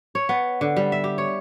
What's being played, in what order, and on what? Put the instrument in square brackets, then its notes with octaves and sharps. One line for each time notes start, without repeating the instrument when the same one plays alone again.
[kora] C#5
B3
D3
G3
E5
G4
C#5